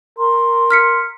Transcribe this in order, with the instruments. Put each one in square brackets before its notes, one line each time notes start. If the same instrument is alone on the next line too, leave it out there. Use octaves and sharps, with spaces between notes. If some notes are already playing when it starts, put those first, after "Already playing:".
[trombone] A#4 [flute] C6
[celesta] F6 B6 C#7